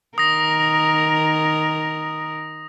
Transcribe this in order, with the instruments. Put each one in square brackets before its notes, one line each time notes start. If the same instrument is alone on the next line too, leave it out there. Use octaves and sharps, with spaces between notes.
[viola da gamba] D#3 A#4 [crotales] D#6 A#6